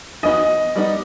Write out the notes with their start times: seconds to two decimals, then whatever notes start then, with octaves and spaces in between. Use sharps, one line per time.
0.23 E3 B3 D#4 F#4 D#5
0.76 G3 B3 D#4